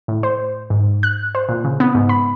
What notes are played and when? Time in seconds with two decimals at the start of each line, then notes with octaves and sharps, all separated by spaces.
0.08 A2
0.23 C5
0.70 G#2
1.03 F#6
1.35 C5
1.49 A#2
1.64 C#3
1.80 B3
1.95 G#2
2.09 B5